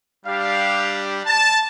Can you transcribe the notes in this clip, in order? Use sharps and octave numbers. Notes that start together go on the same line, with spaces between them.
G3 D4 G4 F5
A5